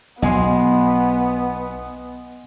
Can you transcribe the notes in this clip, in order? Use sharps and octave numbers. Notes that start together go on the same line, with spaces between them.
B1 B3 D#5 G#5 C6